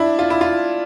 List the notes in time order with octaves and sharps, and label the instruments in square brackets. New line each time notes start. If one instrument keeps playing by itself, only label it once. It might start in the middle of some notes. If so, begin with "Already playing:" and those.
Already playing: [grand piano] D4 E4
F4
E4
F4